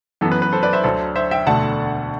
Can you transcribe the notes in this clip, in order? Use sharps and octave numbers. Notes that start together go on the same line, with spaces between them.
F#2 E3 B3 A4
B4
B4
A4 C5
B4 D5
C5 E5
D2 D3 F#3 A4 C5
C5 E5
E5 G5
E1 D2 D3 A3 F#5 A5